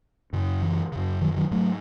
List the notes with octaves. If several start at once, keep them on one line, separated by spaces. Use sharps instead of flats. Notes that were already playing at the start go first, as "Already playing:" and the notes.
F#2 C#3
E3
F#2 C#3
D#3 F#3
D#3 F#3
G#2 F#3 A3